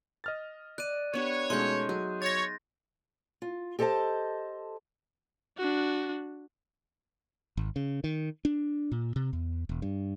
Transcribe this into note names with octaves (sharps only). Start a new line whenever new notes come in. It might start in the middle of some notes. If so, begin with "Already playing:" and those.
D#5 F6 A6
D5 F#6 D#7
B3 D4 G4 C#5
B2 G#3 A3 C#4 D#4 C6 G6
F#3 G#4
C#5 A6 A#6
F4
G4 A4 C5 D#5 A5
D4 F#4
G#1
C#3
D#3
D4
A#2
C3
E2
E1
G2